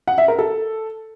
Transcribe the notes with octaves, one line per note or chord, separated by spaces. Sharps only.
F#5
E5
A#4
A4